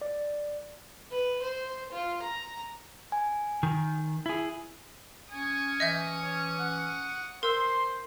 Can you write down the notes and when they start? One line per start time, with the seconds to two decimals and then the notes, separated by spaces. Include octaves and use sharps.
0.02 D5
1.11 B4
1.42 C5
1.92 F4
2.22 A#5
3.12 G#5
3.63 D#3
4.26 E4 G#4
5.31 C#4 G#5 C#6 D#6
5.80 E3 C#4 D#5 E5 G6
6.23 C#5
6.60 F#5
7.43 A#4 C5 C6 E6